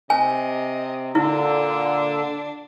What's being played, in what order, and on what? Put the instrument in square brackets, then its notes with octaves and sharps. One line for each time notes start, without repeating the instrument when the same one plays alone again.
[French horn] C3 [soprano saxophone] D#5 [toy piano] G#5
[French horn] A#2 [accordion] D3 [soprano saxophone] D4 [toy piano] E4